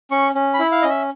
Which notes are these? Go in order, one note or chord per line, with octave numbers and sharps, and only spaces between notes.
C#4 C#6
C#4
B5
E4
F5
C#4 D#5
E5